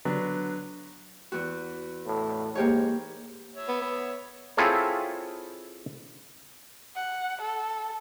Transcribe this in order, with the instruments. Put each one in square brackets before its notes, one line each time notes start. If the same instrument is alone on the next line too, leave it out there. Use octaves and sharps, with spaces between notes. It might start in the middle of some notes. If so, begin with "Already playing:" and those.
[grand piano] D3 F#3 B3 D4
[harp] E2 F#4
[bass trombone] A2
[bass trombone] G#2 [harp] A#3 G4 C#5
[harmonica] C#5 E5
[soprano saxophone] B3
B3
[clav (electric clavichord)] C4 E4 F4 G#4 A4 C#5
[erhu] F#5
A4